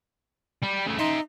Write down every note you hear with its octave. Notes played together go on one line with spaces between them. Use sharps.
G3
C#3 A3
D#4 E5 C6